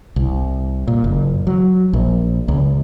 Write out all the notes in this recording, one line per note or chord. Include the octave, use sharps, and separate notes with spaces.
C2
A#2
F#1
F#3
A#1
C#2